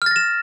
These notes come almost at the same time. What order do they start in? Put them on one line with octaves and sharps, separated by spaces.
F6 A6 A#6 E7